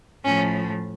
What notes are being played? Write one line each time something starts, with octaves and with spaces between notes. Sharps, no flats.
A2 F3 A3 C#4